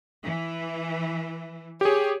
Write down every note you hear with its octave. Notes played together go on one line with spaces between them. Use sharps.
E3
G4 G#4 C#5